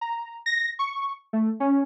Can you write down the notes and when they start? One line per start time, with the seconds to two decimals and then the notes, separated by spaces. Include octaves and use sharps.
0.01 A#5
0.46 A#6
0.79 C#6
1.33 A3
1.60 C#4